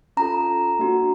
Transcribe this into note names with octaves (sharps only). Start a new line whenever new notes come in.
C#4 F4 A4 A#5
A#3 D4 F#4